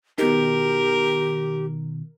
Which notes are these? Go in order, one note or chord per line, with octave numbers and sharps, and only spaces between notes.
B2 D#3 G4 A#4